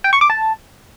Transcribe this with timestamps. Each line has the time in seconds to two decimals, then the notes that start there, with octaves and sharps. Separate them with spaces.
0.04 G5
0.13 C#6
0.21 D6
0.30 A5